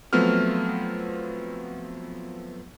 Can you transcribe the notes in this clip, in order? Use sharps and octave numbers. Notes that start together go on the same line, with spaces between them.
F3 F#3 A3 B3 C4 F6